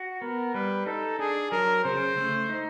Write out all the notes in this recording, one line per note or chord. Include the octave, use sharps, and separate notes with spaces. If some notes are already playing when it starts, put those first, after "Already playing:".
Already playing: F#4
B3 A#4
G3 B4
D#4 A4
D4 G#4
F#3 A#4
C#3 C5
A3
D#4